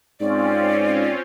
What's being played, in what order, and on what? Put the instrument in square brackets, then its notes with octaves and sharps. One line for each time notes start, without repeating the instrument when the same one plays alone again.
[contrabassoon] G#2 [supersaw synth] C4 C#4 F4 [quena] D5